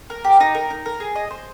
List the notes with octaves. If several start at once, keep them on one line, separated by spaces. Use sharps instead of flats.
A#4
G4
D#4
A#4
D#4
A#4
G#4
D#5
C5